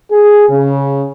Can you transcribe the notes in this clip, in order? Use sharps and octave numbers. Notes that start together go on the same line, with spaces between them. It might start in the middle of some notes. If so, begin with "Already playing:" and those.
G#4
C#3